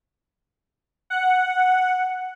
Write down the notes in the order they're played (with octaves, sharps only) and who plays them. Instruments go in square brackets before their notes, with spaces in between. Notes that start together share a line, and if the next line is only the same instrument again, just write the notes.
[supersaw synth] F#5